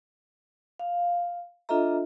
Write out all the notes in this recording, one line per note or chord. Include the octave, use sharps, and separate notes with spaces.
F5
D4 F4 A4 D#5 E5 A#5